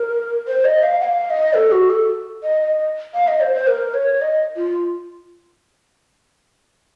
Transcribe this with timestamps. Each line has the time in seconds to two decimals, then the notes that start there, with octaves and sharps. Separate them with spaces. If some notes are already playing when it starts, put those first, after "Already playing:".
Already playing: A#4
0.48 C5
0.65 D#5
0.83 F5
1.01 F#5
1.04 F5
1.27 F5
1.30 D#5
1.54 A4
1.72 F#4
1.90 A4
2.43 D#5
2.61 D#5
3.14 F5
3.28 D#5
3.41 C5
3.53 C5
3.67 A#4
3.94 C#5
4.21 D#5
4.57 F4